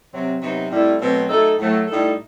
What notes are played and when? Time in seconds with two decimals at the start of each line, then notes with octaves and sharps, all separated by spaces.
0.11 C3 F#3 C4
0.41 C3 F#3 B3 D#4
0.70 A2 G3 C4 E4 A4
1.00 B2 F#3 A3 C4
1.29 F#3 A3 D#4 A4
1.58 A2 F#3 A3
1.87 A2 G3 D#4 A4